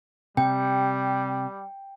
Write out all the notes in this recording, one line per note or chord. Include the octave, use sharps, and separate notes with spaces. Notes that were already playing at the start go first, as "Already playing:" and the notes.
C3 G3 G5